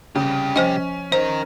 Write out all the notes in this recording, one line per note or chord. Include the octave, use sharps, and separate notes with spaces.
C2 C#3 G4
F3 C#4 C5 D#5
D#4 A#4 C5